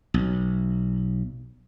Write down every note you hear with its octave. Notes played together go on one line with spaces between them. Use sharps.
B1